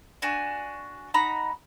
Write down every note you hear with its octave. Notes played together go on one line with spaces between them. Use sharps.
D4 F#4 G#5
D#4 F#4 A#5 B5